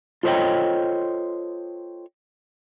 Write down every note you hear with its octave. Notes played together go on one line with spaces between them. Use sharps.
F4 A4 C5 C#5 D#5 G5